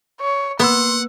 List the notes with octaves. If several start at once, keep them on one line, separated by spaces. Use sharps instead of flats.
C#5
A#3 B3 F#5 C6 E6